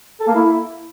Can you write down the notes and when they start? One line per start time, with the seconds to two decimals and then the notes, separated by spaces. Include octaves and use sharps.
0.20 A4
0.27 A#3
0.35 E4